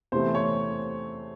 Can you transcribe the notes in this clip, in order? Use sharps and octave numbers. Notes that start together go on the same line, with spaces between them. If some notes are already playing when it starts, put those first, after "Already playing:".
E2 C3 E3 A3 C4 C5
C#5